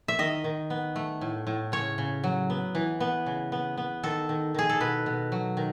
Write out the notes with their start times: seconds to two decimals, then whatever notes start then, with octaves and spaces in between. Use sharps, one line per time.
0.08 E5
0.19 D#3 D#5
0.44 D#3
0.70 B3
0.96 A3
1.21 A2
1.47 A2
1.72 C#3 C#5
1.98 C#3
2.24 F#3
2.50 B3
2.75 E3
3.00 B3
3.26 C#3
3.52 B3
3.78 B3
4.03 D#3 A4
4.29 D#3
4.54 D#3 G#4
4.69 A4
4.80 B2 B4
5.06 B2
5.32 F#3
5.57 D#3